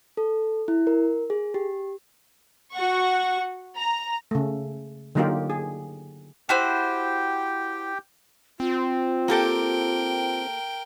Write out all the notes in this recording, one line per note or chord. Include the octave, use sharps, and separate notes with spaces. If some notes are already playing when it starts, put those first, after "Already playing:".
A4
E4
A#4
G#4
G4
F#4 F#5 C#6
A#5
C#3 A3
D3 F#3 A#3 D#4 F4 G4
G#4
E4 F#4 G4 C5 G5
C4 F4
A#3 G4 A4 A#4 G5